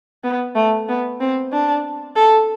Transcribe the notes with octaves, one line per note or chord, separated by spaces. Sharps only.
B3
A3
B3
C4
D4
A4